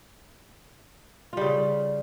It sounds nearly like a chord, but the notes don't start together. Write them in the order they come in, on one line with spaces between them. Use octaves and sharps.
F4 G3 C#3